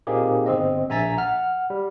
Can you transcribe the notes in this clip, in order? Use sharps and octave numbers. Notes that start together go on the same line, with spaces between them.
A#2 A#3 C4 D#4 G4 G#4
G1 C4 D#5
A#1 E5 G#5 A#5 A6 B6
F#5 F6
G3